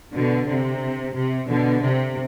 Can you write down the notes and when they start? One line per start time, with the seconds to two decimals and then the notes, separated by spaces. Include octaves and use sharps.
0.15 B2 D3
0.48 C3
1.15 C3
1.49 B2 D3
1.82 C3